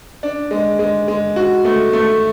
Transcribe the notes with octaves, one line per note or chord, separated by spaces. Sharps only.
D4
G#3
G#3
G#3
F#4
A3
A3